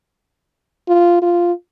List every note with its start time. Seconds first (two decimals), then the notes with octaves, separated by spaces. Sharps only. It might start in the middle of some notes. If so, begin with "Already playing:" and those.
0.88 F4
1.22 F4